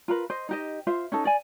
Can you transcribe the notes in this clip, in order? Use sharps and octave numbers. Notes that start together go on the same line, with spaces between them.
F4 A#4 B4
C5 D#5
D#4 G4 D#5
F4 C5 E5
C#4 D#4 A4
D5 G#5